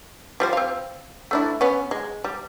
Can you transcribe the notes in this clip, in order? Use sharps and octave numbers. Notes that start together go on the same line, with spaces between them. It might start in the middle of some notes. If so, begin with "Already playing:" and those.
F3 G3 C5
C4 F5
A3 D4 E4
B3 C#4
G#3
G3